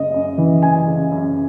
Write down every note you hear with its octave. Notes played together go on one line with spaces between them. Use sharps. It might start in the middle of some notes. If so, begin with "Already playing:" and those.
Already playing: F#2 C#3 D#5
F#2
E3
F#2 G#5
C#3
F#2